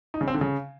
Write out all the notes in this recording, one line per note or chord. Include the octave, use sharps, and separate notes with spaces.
D#4
C#3
C4
D3
C#3